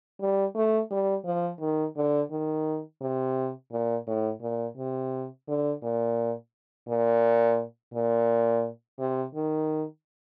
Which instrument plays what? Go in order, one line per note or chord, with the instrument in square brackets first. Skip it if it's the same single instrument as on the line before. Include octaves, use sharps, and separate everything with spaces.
[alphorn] G3
A3
G3
F3
D#3
D3
D#3
C3
A#2
A2
A#2
C3
D3
A#2
A#2
A#2
C3
D#3